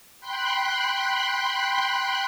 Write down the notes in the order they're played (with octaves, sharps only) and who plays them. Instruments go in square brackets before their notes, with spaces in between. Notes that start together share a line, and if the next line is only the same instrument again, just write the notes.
[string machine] G5 B5 C6 F#6